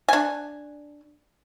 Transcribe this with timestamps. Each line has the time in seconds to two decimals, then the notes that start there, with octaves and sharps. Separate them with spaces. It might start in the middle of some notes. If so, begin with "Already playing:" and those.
0.08 D4 G#5